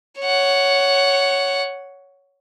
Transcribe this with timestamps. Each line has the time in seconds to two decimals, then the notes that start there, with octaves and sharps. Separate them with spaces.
0.21 C#5 F#5